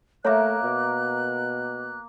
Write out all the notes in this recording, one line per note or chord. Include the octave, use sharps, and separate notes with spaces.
A3 A#3 A#4 C#5 E5 F#6
B2